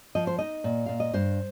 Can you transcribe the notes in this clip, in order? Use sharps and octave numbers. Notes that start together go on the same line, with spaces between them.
F3 D#5
C5
D#4 D#5
A#2
A#2 F5
D#5
G2 C5